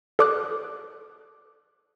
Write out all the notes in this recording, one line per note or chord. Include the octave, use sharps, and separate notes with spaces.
A4 D5 D6 D#6 F#6